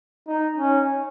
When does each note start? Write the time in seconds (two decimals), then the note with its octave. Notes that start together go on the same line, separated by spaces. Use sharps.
0.28 D#4
0.58 C#4